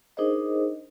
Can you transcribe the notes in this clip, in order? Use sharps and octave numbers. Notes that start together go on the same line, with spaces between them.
D4 D#4 G#4 A#4 C5 D#5